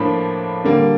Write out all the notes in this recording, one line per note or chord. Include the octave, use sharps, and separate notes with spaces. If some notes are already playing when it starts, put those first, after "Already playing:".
Already playing: A2 F3 A#3 D4 B5
D3 G3 A#3